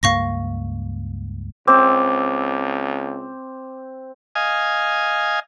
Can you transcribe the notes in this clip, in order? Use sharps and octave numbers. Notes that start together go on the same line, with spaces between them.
C#2 G2 A#3 F5 C#6 A#6
C#2 C4 D6
D#5 F5 G#5